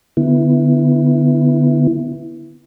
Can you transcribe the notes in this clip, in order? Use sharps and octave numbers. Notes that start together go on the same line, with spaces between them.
D3 B3 E4